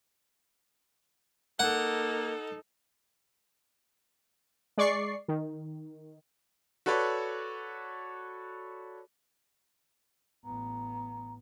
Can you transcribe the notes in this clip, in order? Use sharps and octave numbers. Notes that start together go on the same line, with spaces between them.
A#3 D#4 A4 F#5
G#3 D5 C#6 C7
D#3
F#4 A4 B4 C#5 D5
A1 B3 A#5